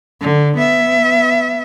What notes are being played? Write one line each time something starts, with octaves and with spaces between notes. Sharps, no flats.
D3
B3 E5